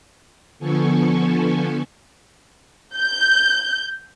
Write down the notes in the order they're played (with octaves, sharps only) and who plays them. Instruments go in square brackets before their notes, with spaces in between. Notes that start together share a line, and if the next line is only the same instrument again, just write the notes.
[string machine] D3 F3 B3 A4 G#5 C#6
[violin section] G6